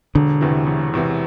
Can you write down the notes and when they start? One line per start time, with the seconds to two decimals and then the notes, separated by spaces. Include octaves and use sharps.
0.15 E1 D3
0.41 E2 C3 E3
0.67 E1
0.94 E2 C3 E3